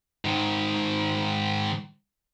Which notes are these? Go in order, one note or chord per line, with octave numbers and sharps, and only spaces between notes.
G#2 D#3